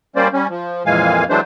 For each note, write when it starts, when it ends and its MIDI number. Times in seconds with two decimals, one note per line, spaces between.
0.16 0.28 55
0.16 0.28 58
0.16 0.28 61
0.16 0.28 72
0.16 0.28 74
0.33 0.47 55
0.33 0.47 61
0.49 0.83 53
0.86 1.24 41
0.86 1.24 46
0.86 1.24 52
0.86 1.24 56
0.86 1.24 77
0.86 1.24 80
1.30 1.40 52
1.30 1.40 54
1.30 1.40 56
1.30 1.40 57
1.30 1.40 62
1.30 1.40 72